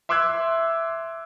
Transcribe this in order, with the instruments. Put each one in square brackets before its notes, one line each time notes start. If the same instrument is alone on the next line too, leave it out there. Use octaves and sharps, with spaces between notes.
[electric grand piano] E5 C6 D6 E6 F#6 G#6